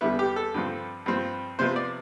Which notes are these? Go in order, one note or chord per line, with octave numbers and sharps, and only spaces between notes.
E2 D3 G3 B3 E4
G4
A4
G2 D3 F3 C4
G2 F3 C4
C3 F3 B3 C5
D5